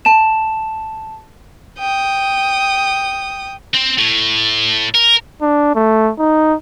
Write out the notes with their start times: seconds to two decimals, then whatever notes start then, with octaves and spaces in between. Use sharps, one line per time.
0.05 A5 E7
1.79 G5 D#6
3.74 C4
3.98 A2
4.94 A#4
5.42 D4
5.75 A3
6.19 D#4